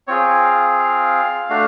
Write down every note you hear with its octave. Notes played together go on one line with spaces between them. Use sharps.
C4 F4 G#4 C#5
F5
F5
A3 D4 F#4